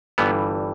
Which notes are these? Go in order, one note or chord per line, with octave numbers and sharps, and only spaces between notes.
G1 G2 E3 G3 B3